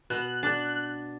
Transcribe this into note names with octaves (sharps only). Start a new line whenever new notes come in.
B2 F#6
D4